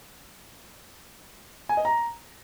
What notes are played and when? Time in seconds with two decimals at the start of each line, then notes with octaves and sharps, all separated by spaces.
1.69 G#5
1.77 D#5
1.85 A#5